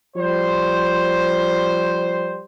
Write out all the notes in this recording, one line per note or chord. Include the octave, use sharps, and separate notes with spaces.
F3 G3 C5